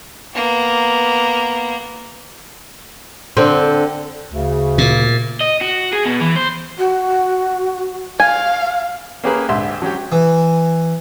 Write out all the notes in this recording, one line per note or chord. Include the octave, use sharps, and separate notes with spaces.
A#3 B3
D3 C4
D2 C#3
A#2
D#5
F#4
G#4
B2
E3
C5
F#4
F5 G#5
A#3 C#4 G4 G#4 A#4 B4
D2 G#2 G4 E5 C6
F#3 C#4 G4
E3